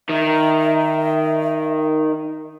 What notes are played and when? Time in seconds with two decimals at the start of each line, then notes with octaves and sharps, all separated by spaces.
0.09 D#3 E5